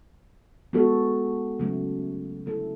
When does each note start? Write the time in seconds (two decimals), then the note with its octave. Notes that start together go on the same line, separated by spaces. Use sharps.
0.73 G#3 B3 F#4 A4
1.59 C#3 F#3 A3
2.46 D3 A3 E4 A4